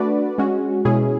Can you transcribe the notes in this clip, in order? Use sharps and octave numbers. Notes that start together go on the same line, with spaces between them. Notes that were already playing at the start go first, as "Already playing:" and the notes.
Already playing: A3 D4 F#4 B4 D5
G#3 C#4 F#4
B2 G#3 C#4 E4 G#4